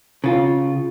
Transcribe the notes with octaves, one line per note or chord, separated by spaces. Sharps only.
C#3 F4